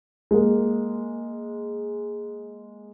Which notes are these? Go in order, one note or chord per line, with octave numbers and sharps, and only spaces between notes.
G#3 A#3